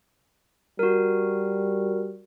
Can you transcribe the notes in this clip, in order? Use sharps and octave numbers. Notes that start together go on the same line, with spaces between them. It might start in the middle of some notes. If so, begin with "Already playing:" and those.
G3 F#4 A#4